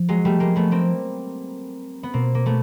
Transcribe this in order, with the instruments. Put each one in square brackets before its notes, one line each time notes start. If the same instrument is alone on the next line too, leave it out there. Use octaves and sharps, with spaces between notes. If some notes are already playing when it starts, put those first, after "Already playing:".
Already playing: [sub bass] F3
[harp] F#3 G#3
G3 A3
G#3 A#3
A3 B3
A#3 C4
B3
[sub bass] B2 [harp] A#3 C4
[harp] A#3
A3 B3